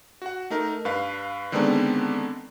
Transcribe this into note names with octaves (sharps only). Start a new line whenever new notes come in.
F#4 F#5
A3 D#4 A#4
G2 B4 F5
D3 D#3 G#3 B3 C4 D4